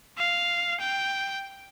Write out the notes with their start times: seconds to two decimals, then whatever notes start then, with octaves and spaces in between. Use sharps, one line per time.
0.18 F5
0.80 G5